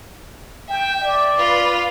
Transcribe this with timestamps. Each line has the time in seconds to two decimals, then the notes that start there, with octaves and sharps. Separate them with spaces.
0.69 E5 G5
1.02 D5
1.36 F4 B4